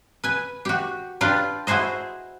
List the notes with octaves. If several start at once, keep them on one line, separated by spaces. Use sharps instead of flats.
B4 G#5
F#4 G4
D4 F4 G4 B4 D5
E4 F#4 G#4 C5 D#5